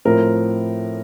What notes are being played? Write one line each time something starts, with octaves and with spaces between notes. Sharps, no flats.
A2 F3 C4 A#4